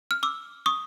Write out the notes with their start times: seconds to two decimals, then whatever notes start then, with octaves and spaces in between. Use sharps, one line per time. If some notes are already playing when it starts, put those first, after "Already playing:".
0.11 F6
0.23 D6 E6
0.66 C#6 D#6